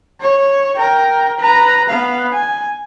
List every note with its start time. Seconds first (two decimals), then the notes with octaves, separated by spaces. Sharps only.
0.21 C#5
0.75 A#4 G5
1.39 B4 A#5
1.89 B3 F5
2.32 G#5